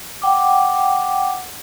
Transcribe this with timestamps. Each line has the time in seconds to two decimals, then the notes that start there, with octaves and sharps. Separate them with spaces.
0.22 F#5 G5 D6